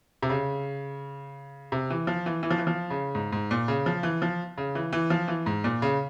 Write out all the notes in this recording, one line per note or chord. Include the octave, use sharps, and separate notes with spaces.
C3
C#3
C3
E3
F3
E3
E3
F3
E3
F3
C#3
G#2
G#2
A#2
C#3
F3
E3
F3
C#3
E3
E3
F3
E3
G#2
A#2
C#3